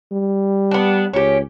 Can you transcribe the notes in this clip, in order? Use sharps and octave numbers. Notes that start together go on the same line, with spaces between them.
G3
B3 D4
C#2 C#4 G4